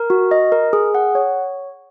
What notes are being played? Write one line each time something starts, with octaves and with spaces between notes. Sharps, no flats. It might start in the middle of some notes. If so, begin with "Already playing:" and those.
Already playing: A#4
F#4
D#5
A#4
G#4
F#5
C#5